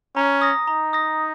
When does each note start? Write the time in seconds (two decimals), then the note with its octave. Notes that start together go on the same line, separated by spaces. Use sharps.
0.16 C#4 A#5
0.42 D#6 A#6
0.67 D#4 A#5
0.93 D#6 A#6